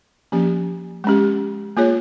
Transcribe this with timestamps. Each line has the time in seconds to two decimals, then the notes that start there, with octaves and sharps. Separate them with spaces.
0.32 F3 A#3 C#4 G4
1.04 G#3 C#4 G4
1.77 A#3 F4 G#4 C#5